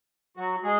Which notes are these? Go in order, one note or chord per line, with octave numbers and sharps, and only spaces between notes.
F#3 F#4
G#3 G#4